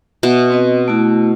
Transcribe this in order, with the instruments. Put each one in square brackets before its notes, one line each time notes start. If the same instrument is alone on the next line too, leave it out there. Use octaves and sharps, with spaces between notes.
[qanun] B2 [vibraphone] E5
[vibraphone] C4 B4 D#5
A3 E4 F#4